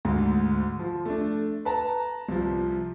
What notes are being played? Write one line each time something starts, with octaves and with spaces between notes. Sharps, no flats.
D2 G#2
F3
A3 D4
B4 A5 A#5
C2 F3